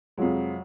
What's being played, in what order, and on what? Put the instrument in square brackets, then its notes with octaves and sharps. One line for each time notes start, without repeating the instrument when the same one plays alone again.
[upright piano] F2 C3 F3 G#3 [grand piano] F#3